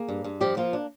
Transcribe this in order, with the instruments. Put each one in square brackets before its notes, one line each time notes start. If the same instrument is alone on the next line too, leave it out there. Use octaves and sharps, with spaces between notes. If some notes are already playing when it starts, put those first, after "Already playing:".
Already playing: [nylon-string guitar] A#3 G#4
G2
G2
F3 G3 G4
F3 A#3 F4
D4